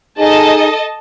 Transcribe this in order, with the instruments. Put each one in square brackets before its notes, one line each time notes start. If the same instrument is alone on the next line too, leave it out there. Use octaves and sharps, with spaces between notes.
[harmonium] D#4 G#4 [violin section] A4 D#5 A5